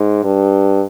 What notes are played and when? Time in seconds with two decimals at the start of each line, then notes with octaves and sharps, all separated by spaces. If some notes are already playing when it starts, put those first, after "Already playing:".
Already playing: G#2
0.24 G2